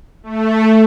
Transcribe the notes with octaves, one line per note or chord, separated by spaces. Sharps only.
A3